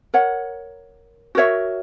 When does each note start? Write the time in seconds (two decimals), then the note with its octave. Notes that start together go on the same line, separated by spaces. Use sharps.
0.14 A#4 C#5 F#5
1.35 F#4 A#4 C#5 E5